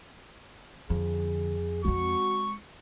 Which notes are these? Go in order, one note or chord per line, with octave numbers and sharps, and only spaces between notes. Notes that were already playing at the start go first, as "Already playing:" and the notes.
F2 D3 G#4
G#3 C4 F#4 C#6